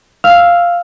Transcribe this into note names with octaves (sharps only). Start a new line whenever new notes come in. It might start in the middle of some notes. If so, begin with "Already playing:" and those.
F5 E6 F6 F7